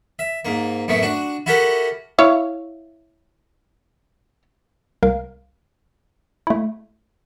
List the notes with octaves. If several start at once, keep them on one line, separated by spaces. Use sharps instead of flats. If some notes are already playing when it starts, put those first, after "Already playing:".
E5
G#2 A#3
F#2 A2 A3 B3
D4 F#4
E4 F#4 G4 A4 A#4 F#5
E4 C#5 F5
C2 A#4 F5
A3 E4